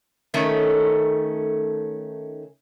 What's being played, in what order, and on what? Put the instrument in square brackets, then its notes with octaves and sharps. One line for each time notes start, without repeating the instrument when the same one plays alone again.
[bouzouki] D#3 A3 C#4